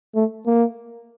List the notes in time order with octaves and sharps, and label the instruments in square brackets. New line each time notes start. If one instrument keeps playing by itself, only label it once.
[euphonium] A3
A#3